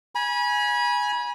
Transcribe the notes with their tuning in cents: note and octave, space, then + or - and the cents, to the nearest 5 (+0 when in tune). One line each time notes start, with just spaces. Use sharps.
G#5 +0 B5 -35